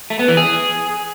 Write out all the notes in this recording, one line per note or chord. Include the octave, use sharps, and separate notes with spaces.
A3
B3
E3
G#4